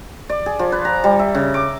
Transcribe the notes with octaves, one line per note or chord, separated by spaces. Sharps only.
D5
G#4
F3
B4
A#5
G3
E5
C#3
D6